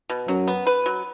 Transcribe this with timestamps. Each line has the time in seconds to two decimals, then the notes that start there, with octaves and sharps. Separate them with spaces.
0.09 B2
0.28 F#2 F#3
0.48 B3
0.67 B4
0.86 F#3